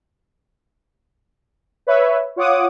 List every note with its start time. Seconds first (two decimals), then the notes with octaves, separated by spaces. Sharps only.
1.87 B4 C#5 E5
2.36 F4 C#5 F#5 D6 D#6